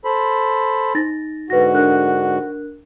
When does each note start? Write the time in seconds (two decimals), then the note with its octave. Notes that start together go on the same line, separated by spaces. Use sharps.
0.05 A4 C5 B5
0.95 D#4 A6 A#6
1.50 G#2 D3 F#4 B4 A#6
1.75 D4 A#4 F#6